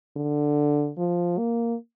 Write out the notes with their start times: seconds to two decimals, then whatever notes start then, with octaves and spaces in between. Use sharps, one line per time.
0.17 D3
0.98 F3
1.38 A#3